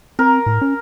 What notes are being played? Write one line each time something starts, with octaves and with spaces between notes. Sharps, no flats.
C4 A#4
A2
C#4